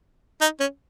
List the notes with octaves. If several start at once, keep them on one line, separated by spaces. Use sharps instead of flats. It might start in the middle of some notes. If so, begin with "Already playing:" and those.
D#4
C#4